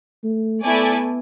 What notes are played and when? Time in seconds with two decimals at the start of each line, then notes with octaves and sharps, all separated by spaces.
0.24 A3
0.64 A3 B3 E4 A4 D5 G#5